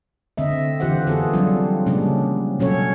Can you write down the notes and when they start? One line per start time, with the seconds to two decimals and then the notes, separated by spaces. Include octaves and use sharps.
0.37 D3 C4 D#5 E5
0.80 D3 E3 F4 G4 C5 F#5
1.07 B3 F4 F#4 G#4 A4
1.33 F#3 G3 C4 D4 F4
1.86 C#3 G3 G#3 A#3 C#4 D4
2.59 B2 F#3 C#4 F#4 A4 C#5